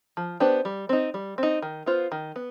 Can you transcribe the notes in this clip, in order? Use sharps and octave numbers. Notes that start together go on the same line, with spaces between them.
F3
B3 D4 G4 C5
G3
C4 D#4
G3
C4 D#4
D#3
B3 F4 C5
D#3
B3